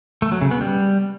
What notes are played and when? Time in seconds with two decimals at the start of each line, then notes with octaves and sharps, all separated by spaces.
0.22 A3
0.32 F#3
0.42 C#3
0.51 B3
0.61 G3